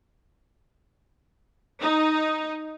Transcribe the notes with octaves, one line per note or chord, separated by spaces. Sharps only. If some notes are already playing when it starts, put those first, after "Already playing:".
D#4